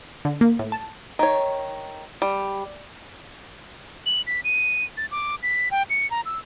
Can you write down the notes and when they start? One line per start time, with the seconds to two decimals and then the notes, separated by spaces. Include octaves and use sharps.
0.25 D3
0.41 A#3
0.59 A2
0.72 A5
1.19 D#3 C#5
2.22 G3
4.06 F#7
4.27 B6
4.44 D#7
4.97 A6
5.11 D6
5.43 B6
5.71 G5
5.90 C#7
6.11 A#5
6.25 E6